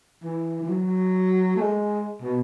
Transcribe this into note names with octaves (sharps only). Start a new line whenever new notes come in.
E3
E3
F#3
A3
G#3
B2